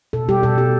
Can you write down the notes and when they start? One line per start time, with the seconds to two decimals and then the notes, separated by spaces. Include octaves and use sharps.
0.13 B2 A4
0.29 G3 G4
0.43 B2 A4
0.58 G3 G4